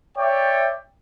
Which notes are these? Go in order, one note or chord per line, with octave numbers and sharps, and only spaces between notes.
C#5 D5 E5 G5